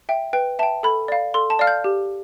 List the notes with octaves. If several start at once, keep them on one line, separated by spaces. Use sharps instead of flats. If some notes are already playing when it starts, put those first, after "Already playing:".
E5 G5
B4 G5
E5 G5 A5
A4 B5
D5 F5
A4 C6
A5
D5 F5 F6
G6
G4